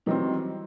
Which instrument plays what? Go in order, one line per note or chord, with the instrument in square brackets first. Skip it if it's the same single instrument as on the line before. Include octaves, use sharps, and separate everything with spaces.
[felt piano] D#3 G3 C4 [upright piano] E3 F#3